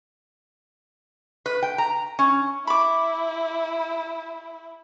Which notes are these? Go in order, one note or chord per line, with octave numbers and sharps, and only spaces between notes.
B4
G5
A#5
C#4
E4 B5 D6